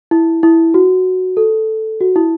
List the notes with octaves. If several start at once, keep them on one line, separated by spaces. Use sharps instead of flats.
E4
E4
F#4
A4
F#4
E4